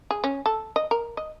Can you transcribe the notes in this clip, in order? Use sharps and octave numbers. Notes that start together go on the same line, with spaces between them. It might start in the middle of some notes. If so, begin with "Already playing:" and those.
G#4
C#4
A4
D#5
A#4
D#5